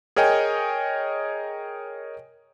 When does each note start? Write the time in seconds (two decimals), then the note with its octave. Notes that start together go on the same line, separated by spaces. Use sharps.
0.16 G#4 A#4 C#5 D#5 G5 G#5